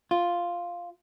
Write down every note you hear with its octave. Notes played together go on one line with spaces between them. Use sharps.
F4